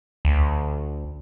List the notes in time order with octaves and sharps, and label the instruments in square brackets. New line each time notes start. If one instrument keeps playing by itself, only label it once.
[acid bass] D2